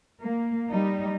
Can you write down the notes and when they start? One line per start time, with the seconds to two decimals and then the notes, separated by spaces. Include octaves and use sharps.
0.22 A#3
0.71 G3 D#4